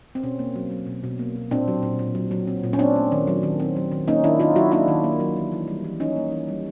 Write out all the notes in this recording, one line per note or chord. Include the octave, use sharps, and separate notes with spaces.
C4
B2 C#4
A#3
F#3
F#3
B2
B2
A#3
B2
A#2 C4 D4
F#3
A#2
A#2
F#3
F#3
C4
A#2
C#4
C4 D4
A3
D#3
F#3
D#3
C4
F#3
D#3
A#3 C#4 D#4
D#3 D4 E4
D#3 D#4 F4
F#3 E4 F#4
A#3 D4 E4
D#3
A#3
F#3
E3
E3
G3
E3
E3 C#4 D#4
A#3
E3
G3